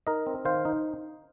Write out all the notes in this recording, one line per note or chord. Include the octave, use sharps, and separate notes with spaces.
D#4 A#4 D#5
C4
D#3 C5 F5
D#4